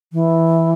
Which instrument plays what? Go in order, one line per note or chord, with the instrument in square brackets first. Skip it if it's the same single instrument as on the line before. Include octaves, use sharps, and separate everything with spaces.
[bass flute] E3